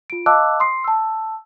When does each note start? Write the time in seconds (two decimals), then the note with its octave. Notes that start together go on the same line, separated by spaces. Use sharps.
0.10 F4 D7
0.26 D#5 F5 A5 D6 E6 F#6
0.60 C6 D#6 C7
0.84 A5 E6